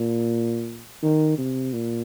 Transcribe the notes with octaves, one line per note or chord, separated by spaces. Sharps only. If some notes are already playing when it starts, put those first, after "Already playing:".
Already playing: A#2
D#3
C3
A#2